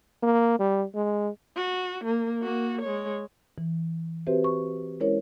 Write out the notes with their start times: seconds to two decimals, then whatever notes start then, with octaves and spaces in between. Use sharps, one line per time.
0.23 A#3
0.60 G3
0.95 G#3
1.56 F#4
2.04 A#3
2.43 A#3 F#4
2.82 G#3 C#5
3.58 E3
4.27 C4 F#4 G4 B4 C5 E5
4.44 C#6
5.00 G#3 C#4 E4 A#4 C5 C#5